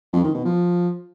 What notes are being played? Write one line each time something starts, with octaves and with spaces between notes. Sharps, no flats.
F2
D#3
B2
F3